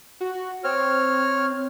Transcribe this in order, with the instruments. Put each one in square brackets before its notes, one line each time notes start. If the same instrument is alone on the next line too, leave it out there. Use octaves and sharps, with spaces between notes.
[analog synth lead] F#4
[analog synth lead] C4 [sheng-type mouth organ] C#5 F6